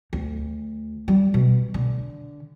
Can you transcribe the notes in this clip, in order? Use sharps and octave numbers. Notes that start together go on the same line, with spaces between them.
D2
G3
B2
D3